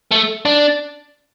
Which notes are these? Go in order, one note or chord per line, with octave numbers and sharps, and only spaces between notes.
A3
D4